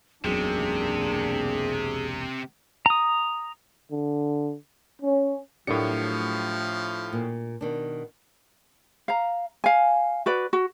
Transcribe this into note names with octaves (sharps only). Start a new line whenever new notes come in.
E1 B1 F#2 C3 A#3 D4 G#4
A#5 D#6
D3
C#4
A2 F3 F#3 A3 D4 G4 A#4 C#7
A#2
B2 D#3 D4
F5 A#5
F5 G#5
F#4 B4 D5
F#4